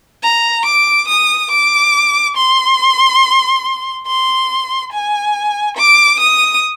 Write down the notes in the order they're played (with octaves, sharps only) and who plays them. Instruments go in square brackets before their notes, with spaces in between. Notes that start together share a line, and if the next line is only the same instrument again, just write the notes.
[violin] A#5
D6
D#6
D6
C6
C6
G#5
D6
D#6